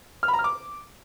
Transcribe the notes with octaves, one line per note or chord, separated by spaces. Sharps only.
F6
B5
A#5
F6
D6